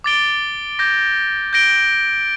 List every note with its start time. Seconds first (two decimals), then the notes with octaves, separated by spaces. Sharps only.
0.04 D6 A6 D7 G7
0.79 D6 G6 A#6
1.53 G6 A#6 D7 G7